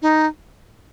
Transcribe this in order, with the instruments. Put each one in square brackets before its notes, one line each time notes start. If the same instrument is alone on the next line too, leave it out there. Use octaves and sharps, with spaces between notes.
[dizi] D#4